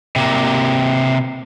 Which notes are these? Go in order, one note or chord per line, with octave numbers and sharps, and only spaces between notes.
C3 A#3